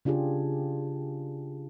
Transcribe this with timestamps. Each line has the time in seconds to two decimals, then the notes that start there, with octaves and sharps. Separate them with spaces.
0.05 C#3 D4 F4 G4 G#4